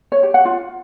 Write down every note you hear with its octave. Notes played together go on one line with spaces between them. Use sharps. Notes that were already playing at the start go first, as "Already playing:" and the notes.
C#5
G4
F#5
F4